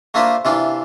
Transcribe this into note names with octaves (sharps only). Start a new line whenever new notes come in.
A3 A#3 D4 F4 B4 C5
C3 E3 D4 F4